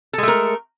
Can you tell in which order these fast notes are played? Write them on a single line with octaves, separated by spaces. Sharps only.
A4 G#3 A3 A#4